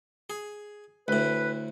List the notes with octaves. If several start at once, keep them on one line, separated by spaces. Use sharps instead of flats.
G#4
D2 A2 B4